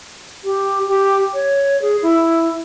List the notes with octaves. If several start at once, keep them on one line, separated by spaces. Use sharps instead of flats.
G4
G4
C#5
G#4
E4